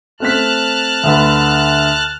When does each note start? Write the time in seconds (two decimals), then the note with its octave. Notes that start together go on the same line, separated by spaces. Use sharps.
0.20 A3 C4 A5 F6 F#6 B6
1.03 D2 D3 B4